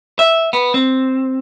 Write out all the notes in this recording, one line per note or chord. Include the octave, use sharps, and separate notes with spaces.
E5
B3
C4